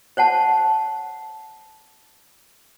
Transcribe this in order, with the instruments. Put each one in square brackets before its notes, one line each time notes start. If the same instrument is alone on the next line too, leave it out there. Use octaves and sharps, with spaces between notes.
[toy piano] C5 C#5 F#5 A5